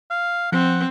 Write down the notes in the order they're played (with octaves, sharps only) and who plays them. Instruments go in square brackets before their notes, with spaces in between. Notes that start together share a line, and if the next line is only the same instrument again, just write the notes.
[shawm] F5
[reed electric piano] F3 [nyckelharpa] C4 [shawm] F#5